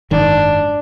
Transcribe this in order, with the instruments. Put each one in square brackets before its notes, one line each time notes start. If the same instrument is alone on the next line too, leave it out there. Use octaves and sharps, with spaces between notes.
[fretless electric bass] F#1 G#2 D#3 [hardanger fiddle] D4